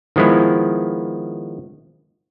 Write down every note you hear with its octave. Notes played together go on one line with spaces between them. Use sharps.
D#3 F3 G#3 B3 E4